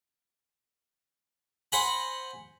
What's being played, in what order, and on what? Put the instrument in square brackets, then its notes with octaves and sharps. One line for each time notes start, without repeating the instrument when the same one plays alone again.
[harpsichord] C5 F#5 G#5 A#5 B5